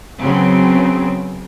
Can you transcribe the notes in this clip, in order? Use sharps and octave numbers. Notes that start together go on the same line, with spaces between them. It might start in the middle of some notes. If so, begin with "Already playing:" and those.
C#3 F#3 B3 C4